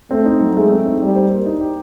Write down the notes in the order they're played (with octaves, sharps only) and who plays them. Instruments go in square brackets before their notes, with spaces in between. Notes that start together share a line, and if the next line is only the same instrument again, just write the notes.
[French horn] A3 [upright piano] C4
[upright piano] D#4
F#3
[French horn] G#3 [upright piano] A3
[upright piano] C4
D#4
[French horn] G3 [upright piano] G4
[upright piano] C5
A#3
D#4
G4